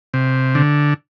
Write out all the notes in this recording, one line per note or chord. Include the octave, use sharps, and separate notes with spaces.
C3
D3